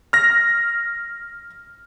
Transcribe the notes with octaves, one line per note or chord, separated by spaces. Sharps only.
F6 A#6